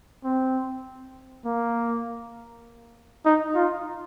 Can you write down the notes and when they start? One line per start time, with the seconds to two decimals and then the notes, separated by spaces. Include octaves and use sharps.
0.24 C4
1.45 A#3
3.26 D#4
3.55 F4